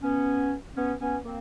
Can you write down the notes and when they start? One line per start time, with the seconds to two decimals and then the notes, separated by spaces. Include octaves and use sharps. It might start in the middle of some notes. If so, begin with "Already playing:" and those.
0.03 B3 C#4
0.76 B3 C#4
1.00 B3 C#4
1.24 A#3 C4